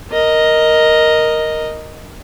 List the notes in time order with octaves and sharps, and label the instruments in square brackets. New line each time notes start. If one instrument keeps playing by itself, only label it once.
[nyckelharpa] A#4 D#5